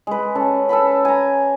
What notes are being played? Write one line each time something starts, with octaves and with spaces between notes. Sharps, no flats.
G#3 B4
C#4 A4 A5
A4 B4 A5 B5
G#5 A#5